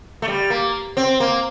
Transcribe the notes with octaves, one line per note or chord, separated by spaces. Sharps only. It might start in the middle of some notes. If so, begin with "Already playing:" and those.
A3
G3
A#3
C4
A#3